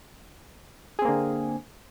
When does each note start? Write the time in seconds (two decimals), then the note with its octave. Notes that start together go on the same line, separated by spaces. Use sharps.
0.99 G#4
1.02 C4
1.05 A#3
1.08 D3